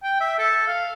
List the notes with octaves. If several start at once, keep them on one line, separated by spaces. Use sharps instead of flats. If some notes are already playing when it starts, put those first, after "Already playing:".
G5
E5
A4
F5